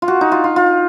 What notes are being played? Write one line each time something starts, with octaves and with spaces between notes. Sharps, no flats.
F4
F#4
D#4
F4
F4
F4